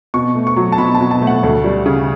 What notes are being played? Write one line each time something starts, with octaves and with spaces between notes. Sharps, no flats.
B2 C#6
A3
C#6
F#3
A5
B2 B5
A5
B2
A5
A3
F#5
D2
G3
C#3